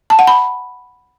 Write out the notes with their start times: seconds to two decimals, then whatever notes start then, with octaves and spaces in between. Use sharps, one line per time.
0.10 A5
0.19 F#5
0.27 B5